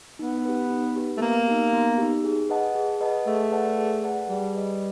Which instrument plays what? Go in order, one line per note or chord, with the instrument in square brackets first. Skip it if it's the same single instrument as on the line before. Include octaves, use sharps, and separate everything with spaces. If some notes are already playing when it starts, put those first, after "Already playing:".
[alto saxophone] B3 [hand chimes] D#4
[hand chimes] G4 B4
D#4
G4 B4
[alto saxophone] A3
[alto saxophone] A#3 [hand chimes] B3
[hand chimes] D#4 G4
B3
D#4 G4
G#4
B4 D#5 F#5 A5
G#4
B4 D#5 F#5 A5
[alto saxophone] A3 [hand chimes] G#4
[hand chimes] B4 D5 F#5 A5
G#4
B4 D5 F#5 A5
[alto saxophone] G3 [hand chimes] G#4
[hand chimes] B4 D#5